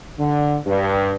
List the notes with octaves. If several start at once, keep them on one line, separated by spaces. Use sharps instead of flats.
D3
G2